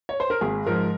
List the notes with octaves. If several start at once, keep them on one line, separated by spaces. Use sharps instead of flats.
C#5
C5
A#4
G#1 G#4
G#2 F3 A#4